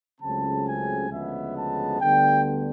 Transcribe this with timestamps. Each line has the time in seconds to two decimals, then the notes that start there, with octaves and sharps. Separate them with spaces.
0.19 C#2 C#3 F#3 A3 C4 A5
0.64 G#5
1.09 D2 C#3 F3 G#3 B3 E5
1.55 A5
2.00 D2 D3 G3 B3 G5